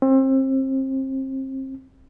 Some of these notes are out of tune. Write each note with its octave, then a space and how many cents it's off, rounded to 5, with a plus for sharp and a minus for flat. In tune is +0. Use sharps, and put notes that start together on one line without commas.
C4 +30